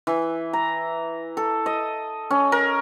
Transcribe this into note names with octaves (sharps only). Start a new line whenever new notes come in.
E3
A#5
A4
D#5
C#4
A#4